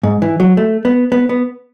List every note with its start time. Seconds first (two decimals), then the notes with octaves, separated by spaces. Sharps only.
0.03 G#2
0.22 E3
0.40 F#3
0.57 A3
0.85 B3
1.12 B3
1.29 B3